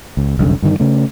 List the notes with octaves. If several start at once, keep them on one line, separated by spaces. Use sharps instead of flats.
C#2
F1 C2 F#2 D3
G2 D3 D#3
C#3 A3